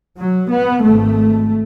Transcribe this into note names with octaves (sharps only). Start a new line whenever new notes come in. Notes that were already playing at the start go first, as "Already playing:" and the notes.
F#3
B3
G#1 G#2 A3